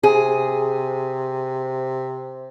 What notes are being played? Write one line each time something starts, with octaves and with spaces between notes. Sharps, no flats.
C3 G#4